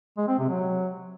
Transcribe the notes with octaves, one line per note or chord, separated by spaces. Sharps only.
G#3
C4
C3
F#3